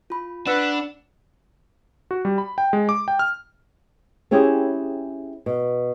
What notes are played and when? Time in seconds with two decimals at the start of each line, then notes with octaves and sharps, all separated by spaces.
0.10 F4 B5
0.47 D4 B4 F#5 E6 C#7
2.11 F#4
2.25 G3
2.38 B5
2.58 G5
2.73 G#3
2.89 D6
3.08 G5
3.19 F6
4.31 C4 C#4 E4 G4 G#4
5.46 B2